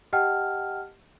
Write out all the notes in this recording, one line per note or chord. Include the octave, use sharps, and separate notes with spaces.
G4 D#5 F#5 G5 A5 F6